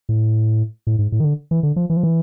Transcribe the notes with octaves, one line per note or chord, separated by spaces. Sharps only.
A2
A2
G#2
A2
D#3
D3
E3
D3
F3
E3
F3
E3